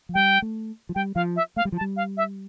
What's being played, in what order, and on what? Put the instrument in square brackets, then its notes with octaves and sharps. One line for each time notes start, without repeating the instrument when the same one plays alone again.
[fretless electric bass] F3
[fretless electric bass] G3 [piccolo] G5
[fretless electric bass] A3
F3
[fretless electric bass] G3 [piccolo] G5
[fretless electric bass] F3 [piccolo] F5
[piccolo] E5
[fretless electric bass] A3 [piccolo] F5
[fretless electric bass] G3
F3
[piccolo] A5
[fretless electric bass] G3
[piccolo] F5
E5